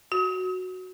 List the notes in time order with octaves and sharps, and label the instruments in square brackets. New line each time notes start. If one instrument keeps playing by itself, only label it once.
[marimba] F#4